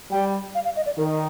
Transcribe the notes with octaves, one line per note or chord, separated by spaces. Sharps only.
G3 G5
F5
F5
D#5
D5
D#3 A#4